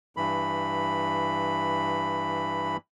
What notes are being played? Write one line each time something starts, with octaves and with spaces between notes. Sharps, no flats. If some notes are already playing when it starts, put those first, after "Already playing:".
G2 E3 B5